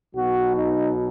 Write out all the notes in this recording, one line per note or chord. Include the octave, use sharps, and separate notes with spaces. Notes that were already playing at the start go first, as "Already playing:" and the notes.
B1 B2 F#3 F#4
D#4